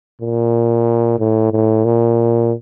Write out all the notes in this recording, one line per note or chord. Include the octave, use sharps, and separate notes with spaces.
A#2
A2
A2
A#2